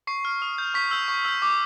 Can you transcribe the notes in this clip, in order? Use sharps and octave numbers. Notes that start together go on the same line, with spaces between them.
C#6 C7
F6
D#6
G6
C#6 B6
E6 G6
C#6
E6 G6
D6